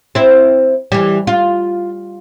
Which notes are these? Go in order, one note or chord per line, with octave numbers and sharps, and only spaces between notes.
C4 E4
E3 G3
F4